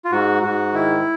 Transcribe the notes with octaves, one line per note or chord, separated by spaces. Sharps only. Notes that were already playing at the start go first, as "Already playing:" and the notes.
F4
G#2 F#4
G#2 F#4
D#3 E4